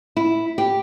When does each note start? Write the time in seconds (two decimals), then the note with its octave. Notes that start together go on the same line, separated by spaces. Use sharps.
0.17 E4
0.58 G4